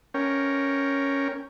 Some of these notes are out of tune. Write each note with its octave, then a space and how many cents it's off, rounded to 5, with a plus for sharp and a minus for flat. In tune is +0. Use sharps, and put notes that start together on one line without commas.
C#4 +0 A#4 +0 G5 +0